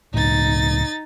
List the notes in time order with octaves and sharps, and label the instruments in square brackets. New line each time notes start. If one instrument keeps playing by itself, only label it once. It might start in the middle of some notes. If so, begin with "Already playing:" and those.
[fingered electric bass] C#2 A2 [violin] D#4 A6